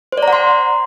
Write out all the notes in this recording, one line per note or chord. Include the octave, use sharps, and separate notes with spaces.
C5
D5
A#5
F#5
C6